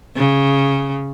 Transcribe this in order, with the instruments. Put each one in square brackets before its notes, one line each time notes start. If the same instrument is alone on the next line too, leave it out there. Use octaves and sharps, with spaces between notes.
[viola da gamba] C#3